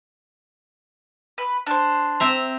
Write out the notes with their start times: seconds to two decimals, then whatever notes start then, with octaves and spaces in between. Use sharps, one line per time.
1.38 B4
1.67 D4 C5
2.20 C4 E5 A#5